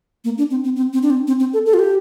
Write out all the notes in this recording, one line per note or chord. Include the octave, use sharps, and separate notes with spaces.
A#3
D4
C4
C4
C4
C4
D4
C4
C4
C4
A4
A4
F4
G4